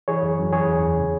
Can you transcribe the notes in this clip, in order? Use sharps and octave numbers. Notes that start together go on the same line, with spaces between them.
E3 G#4 C#5
F#2
F#2
E3 G#4 C#5
E2
E2
C#3